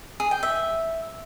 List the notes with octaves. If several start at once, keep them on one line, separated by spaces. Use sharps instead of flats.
G#4
G5
E5